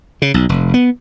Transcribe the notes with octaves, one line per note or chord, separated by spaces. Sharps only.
C#3
B1
F1
B3